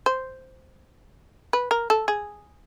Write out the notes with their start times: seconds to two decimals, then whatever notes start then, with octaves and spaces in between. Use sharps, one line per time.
0.06 C5
1.53 B4
1.71 A#4
1.90 A4
2.08 G#4